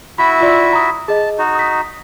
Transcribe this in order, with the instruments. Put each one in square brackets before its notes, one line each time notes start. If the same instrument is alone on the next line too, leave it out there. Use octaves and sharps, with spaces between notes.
[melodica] E4 F#4 E5 [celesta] B5
[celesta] F4 D5 C6
A#5 D#6
[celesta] G#4 D#5 [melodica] A5
[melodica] D#4 F#4
[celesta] D#6 B6